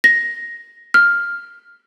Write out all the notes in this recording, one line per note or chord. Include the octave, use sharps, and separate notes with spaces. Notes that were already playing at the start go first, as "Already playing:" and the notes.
A#6
F6